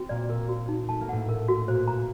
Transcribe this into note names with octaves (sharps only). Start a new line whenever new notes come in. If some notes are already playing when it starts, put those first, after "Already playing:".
Already playing: C4 F#4
A#2 A#3 D5
A#4
F#4
D#4
A3 A5
A#3
A2 A3 F#5
A#4
F#4
A#2 A#3 C5
A#5